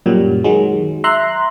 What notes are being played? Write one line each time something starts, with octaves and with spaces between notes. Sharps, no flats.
F#2 A#2 F#3 G3
D#3 F#3 G#3
E5 A#5 C6 F#6